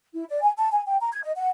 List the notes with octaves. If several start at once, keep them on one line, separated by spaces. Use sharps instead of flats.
E4
D5
G#5
A5
G#5
G5
A#5
G#6
D#5
F#5